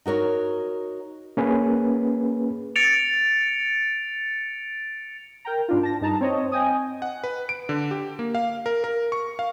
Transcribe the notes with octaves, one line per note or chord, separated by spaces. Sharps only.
D#4 F#4 A#4 C#5
A#3 C#4 G#4 B4
A6 C#7 D7 F7
A#4 G5 A#5
G#2 D4 F4
A5 A#6
G2 D#4 A5 A#5
C4 C#5 D#5
D#5 G5 G#5 D#6
F#5
B4
D7
D3
G4
A#3
F5
A#4
A#4
C#6
F5